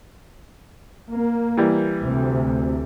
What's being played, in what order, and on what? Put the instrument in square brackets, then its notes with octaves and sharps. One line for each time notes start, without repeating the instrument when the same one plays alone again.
[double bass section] A#3
[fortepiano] E3 G3
[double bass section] D2 C3